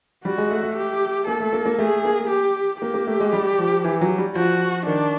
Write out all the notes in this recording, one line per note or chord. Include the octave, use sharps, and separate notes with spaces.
G3 F#4
G#3
A3
A3
G4
A#3 A4
A3
A#3
A#3
A3 G#4
A#3
G4
A#3 G4
A#3
A3
G#3
G3
F3
E3
F#3
G3
F3 F#4
D#3 D4